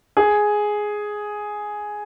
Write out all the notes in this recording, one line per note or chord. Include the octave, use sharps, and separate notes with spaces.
G#4